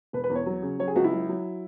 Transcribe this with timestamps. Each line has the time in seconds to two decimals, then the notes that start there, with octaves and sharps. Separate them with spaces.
0.13 E1 B4
0.24 B4
0.30 E2
0.35 C#5
0.46 F#3
0.62 C#3
0.79 F#3 C#5
0.88 G#4
0.96 C#2 F#4
1.04 E4
1.12 F#3
1.29 F#3